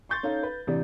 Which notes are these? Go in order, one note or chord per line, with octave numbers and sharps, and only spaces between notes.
C6 C#6 G6 A6
C#4 D#4 A4 F5
B4
A1 C3 D4